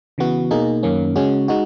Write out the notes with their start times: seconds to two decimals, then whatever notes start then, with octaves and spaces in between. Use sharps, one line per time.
0.18 C#3 E3 B3 F#4
0.51 B2 A#3 D#4 G#4
0.83 F#2 D#3 A#3 C#4
1.16 C#3 G#3 C#4 F#4
1.48 G#3 D#4 F#4